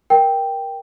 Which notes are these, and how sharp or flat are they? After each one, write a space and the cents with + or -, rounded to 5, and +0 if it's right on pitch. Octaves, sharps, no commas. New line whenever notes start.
A#4 +20 G5 +0